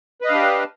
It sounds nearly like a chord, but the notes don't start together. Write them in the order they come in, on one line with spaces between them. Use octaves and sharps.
B4 D#5 F5 D4 G4